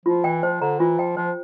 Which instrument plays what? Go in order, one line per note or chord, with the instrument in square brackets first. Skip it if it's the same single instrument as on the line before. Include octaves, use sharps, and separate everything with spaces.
[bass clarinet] F3 [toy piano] F4
[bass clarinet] E3 [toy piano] G5
[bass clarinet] F3 [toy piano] C5
[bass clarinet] D3 [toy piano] A#5
[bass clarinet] E3 [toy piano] F4
[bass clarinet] F3 [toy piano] G5
[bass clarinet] F3 [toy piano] C5